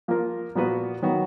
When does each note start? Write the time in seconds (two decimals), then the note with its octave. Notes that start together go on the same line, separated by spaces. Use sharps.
0.08 F3 A#3 F4 A#4
0.55 A#2 F3 B3 F#4 B4
1.02 D#3 F#3 B3 F#4